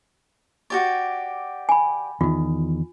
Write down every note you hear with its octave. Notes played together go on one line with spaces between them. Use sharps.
F#4 G4 D5
G#5 B5
E2 D#3 F4